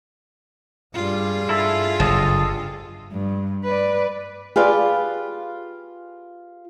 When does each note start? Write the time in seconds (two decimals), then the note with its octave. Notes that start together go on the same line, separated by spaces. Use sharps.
0.94 G2 G3 F4 G#4
1.49 G2 E4 A4 E5
2.00 F#1 A4 D#5 A5
3.12 G2
3.64 B4 D5
4.56 F4 G4 G#4 B4 D5 F5